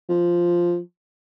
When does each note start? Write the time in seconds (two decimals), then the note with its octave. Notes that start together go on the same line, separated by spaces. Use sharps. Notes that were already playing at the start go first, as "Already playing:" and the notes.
0.09 F3